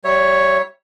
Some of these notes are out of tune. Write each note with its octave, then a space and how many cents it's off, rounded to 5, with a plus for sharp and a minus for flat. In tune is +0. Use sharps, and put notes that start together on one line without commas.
G3 -30 C#5 +0 E5 +0